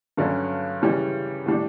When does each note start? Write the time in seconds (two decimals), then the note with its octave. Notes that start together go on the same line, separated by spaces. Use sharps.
0.17 G2 D3 F#3 C#4
0.82 C#3 E3 G3 C#4
1.46 A2 G3 D4